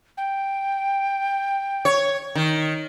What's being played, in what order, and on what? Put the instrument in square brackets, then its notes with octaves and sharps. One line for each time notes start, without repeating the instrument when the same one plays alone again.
[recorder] G5
[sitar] C#5
D#3